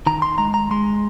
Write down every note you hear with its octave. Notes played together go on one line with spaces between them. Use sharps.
D#3 A#5
C6
G#3 A#5
A#5
G#3 C6